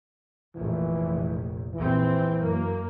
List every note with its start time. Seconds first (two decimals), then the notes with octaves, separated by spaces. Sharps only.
0.55 F1 A#1 E3
1.75 A#1 E3 C4
2.40 F#2 A#3